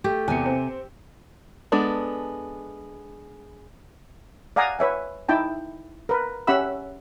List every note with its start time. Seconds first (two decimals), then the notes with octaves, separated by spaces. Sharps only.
0.04 A3 G4
0.28 E2 C3 G#5 C#7
0.46 C4
1.72 G#3 B3 D4 A4
4.56 D5 F5 F#5 G#5 A#5 D#6
4.79 B4 C#5 E5 G#5
5.29 D#4 E4 G5 A5
6.09 A#4 B4
6.47 C#4 G4 E5 F#5 B5 E6